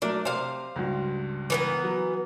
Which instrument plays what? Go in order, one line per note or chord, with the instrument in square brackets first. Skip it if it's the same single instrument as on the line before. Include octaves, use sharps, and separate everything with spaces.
[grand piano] F#3 A3 A#4 [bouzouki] D4
[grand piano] C3 [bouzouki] C5 F5
[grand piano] C#2 G2 F#4
[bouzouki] E3 B3 A#4
[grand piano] F#3